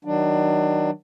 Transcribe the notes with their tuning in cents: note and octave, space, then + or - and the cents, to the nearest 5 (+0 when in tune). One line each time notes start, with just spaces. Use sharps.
D#3 +20 F#3 +20 D4 +25